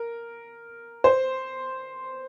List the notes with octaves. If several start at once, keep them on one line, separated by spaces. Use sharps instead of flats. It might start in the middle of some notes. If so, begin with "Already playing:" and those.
Already playing: A#4
C5